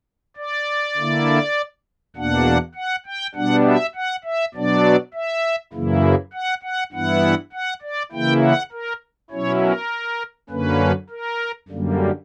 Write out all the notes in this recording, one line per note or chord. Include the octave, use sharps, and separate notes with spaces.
D5
D3 A#3 E4
E2 B2 A#3 D4 F#5
F#5
G5
B2 G3 B3 D4 F#5
E5
F#5
E5
B2 F#3 B3 D4 D5
E5
F#2 C#3 E3 A#3 E4
F#5
F#5
G2 E3 B3 E4 F#5
F#5
D5
C#3 E3 A#3 E4 G5
F#5
A#4
B2 F#3 C#4 E4 C#5
A#4
F#2 D3 A#3 C#4 B4
A#4
F#2 D3 G3 A#3